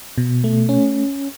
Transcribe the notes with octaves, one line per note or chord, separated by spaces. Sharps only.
B2
A3
C#4